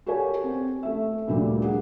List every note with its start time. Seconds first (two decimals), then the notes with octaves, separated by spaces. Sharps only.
0.06 F#4 G4 A4 A#4 C#5 G#5
0.44 C4
0.83 A3 E5
1.27 D2 A#2 D3 G3 A#3
1.62 G4 G#4 F#5